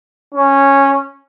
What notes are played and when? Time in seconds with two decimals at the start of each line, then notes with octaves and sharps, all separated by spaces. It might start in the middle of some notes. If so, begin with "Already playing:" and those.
0.35 C#4